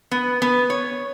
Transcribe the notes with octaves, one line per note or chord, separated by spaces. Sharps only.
B3
B3
C#5